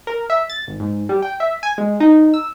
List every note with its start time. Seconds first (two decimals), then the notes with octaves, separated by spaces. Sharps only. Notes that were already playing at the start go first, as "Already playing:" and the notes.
0.07 A#4
0.30 E5
0.50 A6
0.68 G#1
0.80 G#2
1.09 G3
1.22 G5
1.40 E5
1.63 G#5
1.78 G#3
2.00 D#4
2.34 E6